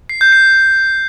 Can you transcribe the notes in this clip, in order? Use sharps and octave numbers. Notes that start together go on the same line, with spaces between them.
C7
G6
C7